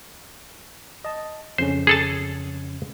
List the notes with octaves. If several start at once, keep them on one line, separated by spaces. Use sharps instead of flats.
D#5 A5
F2 C#3 C#4 C5
G#4 A4 A5